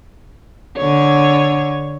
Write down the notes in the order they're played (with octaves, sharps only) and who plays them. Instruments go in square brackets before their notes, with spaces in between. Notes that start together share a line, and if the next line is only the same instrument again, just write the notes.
[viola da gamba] D3 C#5